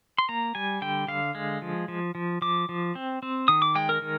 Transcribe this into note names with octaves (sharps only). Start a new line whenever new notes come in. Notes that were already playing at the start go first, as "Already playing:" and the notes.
C6
A#3 A#5
G3 G#5
D3 G5
D3 F5
G#3
F3
F3
F3
F3 D6
F3
C4
C4
D#3 D#6
D6
G#3 G5
A#4
D#3